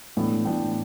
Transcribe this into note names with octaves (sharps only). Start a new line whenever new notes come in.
A2 E3 B3 D4
A2 E3 B3 D4 G5